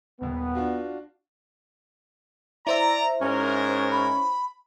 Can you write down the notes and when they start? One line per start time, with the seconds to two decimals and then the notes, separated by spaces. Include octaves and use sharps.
0.21 D#1 D#2 B3
0.55 D4 F4 F#4
2.67 E4 C5 D5 E5 A#5
3.21 G#2 C#4 A#4
3.91 B5